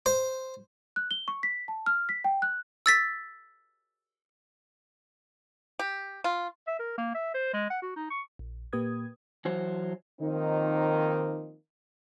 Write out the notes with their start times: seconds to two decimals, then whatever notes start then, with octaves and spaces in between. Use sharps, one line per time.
0.06 C5
0.96 F#6
1.11 G7
1.28 C#6
1.43 B6
1.68 A5
1.86 F6
2.09 B6
2.24 G5
2.42 F#6
2.86 E6 A6 B6
5.79 G4
6.24 F4
6.67 E5
6.79 A#4
6.98 A#3
7.15 E5
7.34 C5
7.53 G#3
7.70 F#5
7.82 F#4
7.96 D#4
8.10 C#6
8.39 A#1
8.73 A#2 A#3 G4 B4 D#6 G#6
9.45 E3 F#3 C5
10.21 D#3 F3 A#3 C4 D#4